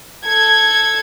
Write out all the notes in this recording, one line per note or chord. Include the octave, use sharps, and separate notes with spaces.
A4 G#6